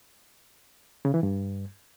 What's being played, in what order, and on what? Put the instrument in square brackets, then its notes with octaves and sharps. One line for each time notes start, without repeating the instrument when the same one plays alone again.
[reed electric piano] C#3
E3
G2